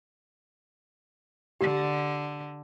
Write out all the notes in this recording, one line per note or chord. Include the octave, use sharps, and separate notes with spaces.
D3 G4